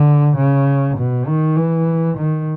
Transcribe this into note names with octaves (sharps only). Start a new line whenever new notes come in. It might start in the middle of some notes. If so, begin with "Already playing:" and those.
Already playing: D3
C#3
B2
D#3
E3
D#3